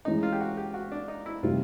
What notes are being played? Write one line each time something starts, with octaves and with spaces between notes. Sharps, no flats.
E3 G#3 C#4 D#4
F4
G4
F#4
G4
F#4
D4
D#4
E4
C3 D#3 G3 F4